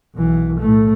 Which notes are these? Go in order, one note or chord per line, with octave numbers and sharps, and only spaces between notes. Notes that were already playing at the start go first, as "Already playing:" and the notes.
B1 E3
A2 A3